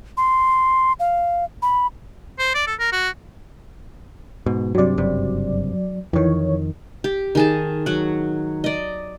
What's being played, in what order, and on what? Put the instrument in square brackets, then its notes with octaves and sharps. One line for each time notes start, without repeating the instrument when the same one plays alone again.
[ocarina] C6
F5
B5
[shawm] C5
D5
A4
A#4
F#4
[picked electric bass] G#2 B2
[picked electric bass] G2 C3 [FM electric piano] F#3 D5
[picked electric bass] F#1 G2 C3
[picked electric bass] F2 D#3 [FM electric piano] E3 C#5
[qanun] G4
D#3 G#4 A5
F#3 F#5
D5 D#5